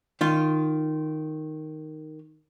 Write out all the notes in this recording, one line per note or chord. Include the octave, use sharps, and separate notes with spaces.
D#3 F4